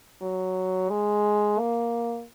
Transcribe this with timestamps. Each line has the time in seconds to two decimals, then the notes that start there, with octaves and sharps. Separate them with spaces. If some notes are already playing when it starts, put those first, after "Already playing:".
0.22 F#3
0.90 G#3
1.59 A#3